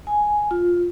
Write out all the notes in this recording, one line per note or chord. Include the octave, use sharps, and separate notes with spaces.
G#5
F4